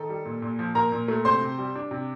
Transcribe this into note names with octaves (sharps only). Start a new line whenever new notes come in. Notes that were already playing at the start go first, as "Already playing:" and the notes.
Already playing: D#3 A4
G3
A#2
A#2
F3
A#2 A#4 A#5
A#2
A3
C3 C5 C6
C3
G3
D4
C3